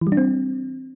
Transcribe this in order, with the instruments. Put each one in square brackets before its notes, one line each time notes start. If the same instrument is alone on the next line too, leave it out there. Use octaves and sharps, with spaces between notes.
[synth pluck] E3
G3
D4
C4